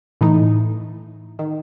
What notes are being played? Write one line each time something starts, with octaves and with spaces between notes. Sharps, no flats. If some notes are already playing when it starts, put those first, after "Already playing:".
A2 E3 A3 D#4
D#3